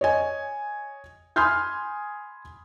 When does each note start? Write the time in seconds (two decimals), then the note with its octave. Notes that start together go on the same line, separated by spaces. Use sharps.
0.01 C#5 D#5 G#5
1.36 G#5 B5 C6 D#6 F6 G6